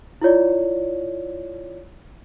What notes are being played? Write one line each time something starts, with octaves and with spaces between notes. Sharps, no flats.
E4 F4 C#5 D5